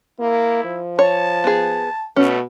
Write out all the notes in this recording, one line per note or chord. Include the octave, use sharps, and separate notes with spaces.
A#3 E4
F3
C#5 A5
B3 G#4
B2 A3 C#4